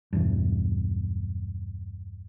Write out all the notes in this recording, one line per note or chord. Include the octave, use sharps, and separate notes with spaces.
B1 E2 G2